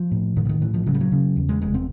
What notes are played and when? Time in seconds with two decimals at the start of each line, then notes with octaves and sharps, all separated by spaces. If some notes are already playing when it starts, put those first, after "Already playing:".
Already playing: F3
0.11 A2
0.36 A2 D#3
0.45 D3
0.49 D#3
0.61 A2 E3
0.74 F3
0.86 C#3 F#3
0.94 G3
1.01 F#3
1.12 C#3
1.36 E2
1.49 G#3
1.62 F1 G#3
1.74 C4